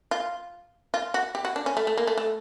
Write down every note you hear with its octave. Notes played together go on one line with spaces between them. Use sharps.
F4
F4
F#4
G4
F#4
D4
C#4
A3
A3
A#3
A3
A3